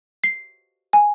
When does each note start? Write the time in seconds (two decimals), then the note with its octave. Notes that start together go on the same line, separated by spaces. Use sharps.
0.24 C7
0.93 G#5